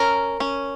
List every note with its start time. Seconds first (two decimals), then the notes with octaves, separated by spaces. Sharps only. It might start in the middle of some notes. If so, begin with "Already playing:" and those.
Already playing: C#4 A#4
0.40 C#4